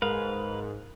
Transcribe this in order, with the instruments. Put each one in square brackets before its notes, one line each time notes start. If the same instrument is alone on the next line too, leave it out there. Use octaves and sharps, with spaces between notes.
[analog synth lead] G#2 [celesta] A#4 [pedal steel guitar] B4 F5